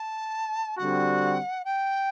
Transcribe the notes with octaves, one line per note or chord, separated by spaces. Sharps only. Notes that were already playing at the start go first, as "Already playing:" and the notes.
Already playing: A5
D3 G3 C4 F#4 F#5
G5